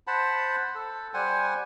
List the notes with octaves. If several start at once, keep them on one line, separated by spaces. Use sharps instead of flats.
C5 F#5 A5 B5
A4
G3 C5 F#5 G#5